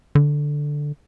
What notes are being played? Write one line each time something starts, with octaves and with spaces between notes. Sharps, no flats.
D3